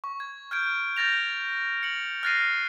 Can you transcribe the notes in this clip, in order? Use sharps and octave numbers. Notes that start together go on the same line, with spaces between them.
C#6
G#6
F6 G6 G#6 D7
F6 G6 A6 A#6 F7
C#7 F#7
F6 F#6 A6 A#6 C7 D#7